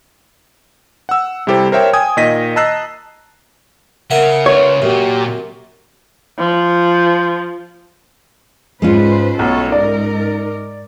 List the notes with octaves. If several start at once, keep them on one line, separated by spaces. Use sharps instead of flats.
F#5 E6
C3 G3 E4 G4 A4 C5
A#4 C5 C#5 E5 G5
G5 G#5 D#6 G#6
A#2 D#3 D#5 A#6 B6 D#7
D#5 A5 A#5 E6 F#6 C7
C#3 A#4 E5 F#5
C#3 F4 B4 C#5
F#2 A#2 G4
F3
G#2 G#3 C#4 F4 B4 C5
B1 A3 A4 C#5
G#2 D#4 A#4 D5